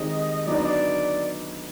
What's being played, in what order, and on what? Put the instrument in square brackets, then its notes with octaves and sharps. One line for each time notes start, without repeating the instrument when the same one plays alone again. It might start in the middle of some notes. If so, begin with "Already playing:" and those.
Already playing: [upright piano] D#3 G#3 C4 D#4 G4 [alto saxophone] D#5
[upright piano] D3 F#3 B3 D#4 F#4 [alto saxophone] D5
[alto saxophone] D#5
D5